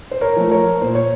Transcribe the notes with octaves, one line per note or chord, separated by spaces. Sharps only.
C5
A#4 C#5
F3 A3
A#4 C#5
A#2 C5
C#5